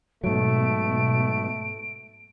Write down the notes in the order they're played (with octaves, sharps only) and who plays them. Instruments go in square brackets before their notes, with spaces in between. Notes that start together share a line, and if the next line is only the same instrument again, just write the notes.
[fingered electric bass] G#2 F#3 [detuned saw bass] B2 [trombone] A3 [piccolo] D7